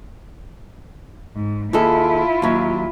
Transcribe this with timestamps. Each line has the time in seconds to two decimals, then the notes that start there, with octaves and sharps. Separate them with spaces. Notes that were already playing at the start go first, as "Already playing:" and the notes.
1.35 G#2
1.73 D#2 E4 F4 G#4 A4
2.42 D#2 F#3